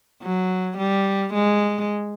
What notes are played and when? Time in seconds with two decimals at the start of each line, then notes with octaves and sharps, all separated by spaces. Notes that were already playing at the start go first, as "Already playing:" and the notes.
0.22 F#3
0.78 G3
1.34 G#3